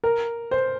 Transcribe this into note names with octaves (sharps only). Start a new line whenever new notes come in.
A#4
C5